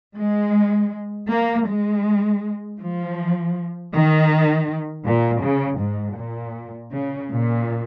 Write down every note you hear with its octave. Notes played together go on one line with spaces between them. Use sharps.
G#3
A#3
G#3
F3
D#3
A#2
C#3
G#2
A#2
C#3
A#2